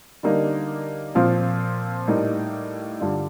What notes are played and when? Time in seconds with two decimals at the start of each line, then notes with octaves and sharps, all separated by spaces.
0.23 D3 G3 A#3 D#4
1.15 A#2 F3 C4 F4
2.08 A2 G3 A#3 D#4
3.00 G2 D3 G3 D4 F4